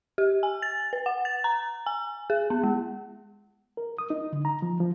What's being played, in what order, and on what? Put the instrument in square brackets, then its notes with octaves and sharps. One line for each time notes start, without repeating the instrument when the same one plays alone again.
[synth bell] G4
G#5
A6
B4
F#5
A6
A#5
G#5
G#4
B3
G#3
[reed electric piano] A#4
D#6
D#4
D3
A#5
F3
F3